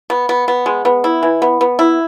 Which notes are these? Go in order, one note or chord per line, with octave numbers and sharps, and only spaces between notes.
B3
B3
B3
G#3
B3
E4
E3
B3
B3
E4